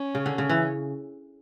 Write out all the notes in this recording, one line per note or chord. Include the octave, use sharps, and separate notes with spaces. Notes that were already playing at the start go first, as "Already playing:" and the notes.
Already playing: C#4
C#3
D3
C#3
E3